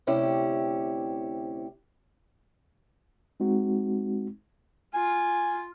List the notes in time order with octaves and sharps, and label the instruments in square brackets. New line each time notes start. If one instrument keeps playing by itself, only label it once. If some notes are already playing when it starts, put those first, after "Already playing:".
[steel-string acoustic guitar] D2 C3 C#4 E4 G4
[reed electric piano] G#3 C4 D#4 F#4
[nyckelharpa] F4 [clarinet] G#5